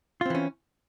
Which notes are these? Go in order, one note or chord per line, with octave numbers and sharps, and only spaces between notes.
E3 C4 C#4 F4